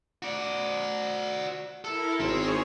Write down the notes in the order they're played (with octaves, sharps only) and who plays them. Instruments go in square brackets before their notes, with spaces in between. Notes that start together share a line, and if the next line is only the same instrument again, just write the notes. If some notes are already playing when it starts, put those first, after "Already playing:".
[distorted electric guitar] F#4 D5
[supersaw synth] E4 A#4 [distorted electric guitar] A4
[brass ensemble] G#1 [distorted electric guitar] C4 C5 [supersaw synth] G#4 C#5